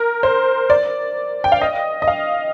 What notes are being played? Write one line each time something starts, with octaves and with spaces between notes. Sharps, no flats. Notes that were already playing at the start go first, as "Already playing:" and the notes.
Already playing: A#4
C5
D5
G5
F5
D#5
D#5
F5